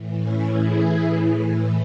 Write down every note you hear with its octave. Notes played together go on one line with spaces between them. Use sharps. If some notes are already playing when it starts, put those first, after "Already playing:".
Already playing: A2 E3
C#4 E4
E4 G#4